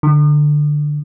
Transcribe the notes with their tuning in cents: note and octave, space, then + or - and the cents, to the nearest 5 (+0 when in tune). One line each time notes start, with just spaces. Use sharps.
D3 +10